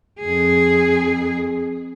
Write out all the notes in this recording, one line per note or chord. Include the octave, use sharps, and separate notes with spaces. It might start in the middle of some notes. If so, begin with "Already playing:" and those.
F2 G#4